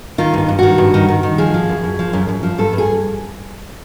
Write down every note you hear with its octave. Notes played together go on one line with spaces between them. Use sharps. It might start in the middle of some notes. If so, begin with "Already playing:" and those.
D#3 F4
G2 F4
G2
D#3 F#4
G2
D#3
D#3
D#3
F3 G#4
F3
F#2
F#2
F3
F#2
F#2
F3
G2 A4
G2
G#4